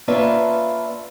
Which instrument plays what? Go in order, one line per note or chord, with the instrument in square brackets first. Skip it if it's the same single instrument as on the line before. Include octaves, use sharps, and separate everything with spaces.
[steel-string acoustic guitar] A#3 C#4 D4 F4 B4 E5